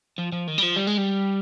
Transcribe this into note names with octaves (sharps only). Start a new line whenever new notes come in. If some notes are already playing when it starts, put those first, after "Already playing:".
F3
F3
D#3
G3
F3
G3
G#3
G3